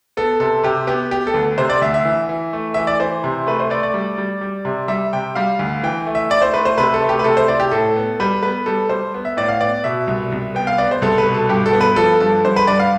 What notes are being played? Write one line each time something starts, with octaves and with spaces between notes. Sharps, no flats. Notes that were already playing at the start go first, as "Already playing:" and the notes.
B3 A4
C3 A4
C3 G4
B3 G4
B3 G4
A4
D2
C3 C5
D5
D2 E5
E5
E3
E3
A3
E3 E5
D5
E3 C5
C3
A3 B4
C5
A3 D5
D5
G3
G3
G3
C3
G3 E5
C3 G5
G3 F5
D2
E3 G5
A3
E5
E4 D5
C5
A3 B4
C5
C3 B4
A4
A3
G4
B4
C3 A4
C5
E4 D5
G4
A2 A4
B3
G3 B4
B3 B4
G3 A4
G3 C5
B3
E5
A2 D5
F5
B3 D5
B2 E5
C2
C2
B3 G5
F5
B3 D5
C5
C2 A4
B4
B2
A4
G2 G4
A4
B3
B4
F3 A4
G2 A4
G2 C5
B4
G2 D5
F5